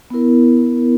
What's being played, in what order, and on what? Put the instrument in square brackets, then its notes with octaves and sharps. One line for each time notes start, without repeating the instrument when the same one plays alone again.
[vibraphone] B3 E4 A#4